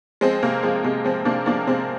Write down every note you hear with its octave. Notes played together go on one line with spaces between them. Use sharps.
F3 G#3 C4
C3 A#3
F3 G#3
C3 G#3
F3 G#3 C4
C3 A#3 D4
F3 A#3 D4
C3 G#3 C4